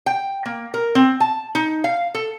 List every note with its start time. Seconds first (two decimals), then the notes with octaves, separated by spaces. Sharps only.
0.06 G5
0.45 A#3
0.74 A#4
0.95 C4
1.20 A5
1.55 D#4
1.84 F5
2.15 A4